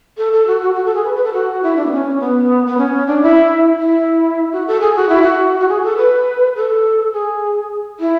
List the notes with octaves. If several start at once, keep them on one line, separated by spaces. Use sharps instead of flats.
A4
A4
F#4
F#4
F#4
A4
G#4
B4
B4
A4
F#4
E4
D4
B3
C#4
B3
B3
C#4
D4
E4
E4
F#4
A4
G#4
F#4
E4
F#4
F#4
G#4
A4
B4
A4
G#4
E4